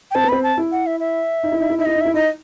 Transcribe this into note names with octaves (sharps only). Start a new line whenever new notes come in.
G5
C4 A5
B3
C4 B5
A5
E4
F#5
E5
E5
D#4
E4
D#4
E4
D#4 E5
E4 D#5
D#4
E4 E5
D#4 D#5